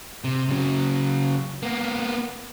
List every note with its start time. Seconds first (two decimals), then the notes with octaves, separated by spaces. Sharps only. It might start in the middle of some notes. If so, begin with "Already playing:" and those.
0.24 C3
0.49 C#3 F#3
1.63 A#3 B3